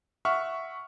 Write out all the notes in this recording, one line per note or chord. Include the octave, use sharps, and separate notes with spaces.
E5 F#5 C#6 F6